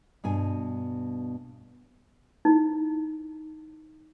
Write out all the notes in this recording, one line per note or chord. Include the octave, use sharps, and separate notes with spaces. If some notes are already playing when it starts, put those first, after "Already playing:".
G2 B2 G#5
D#4 E4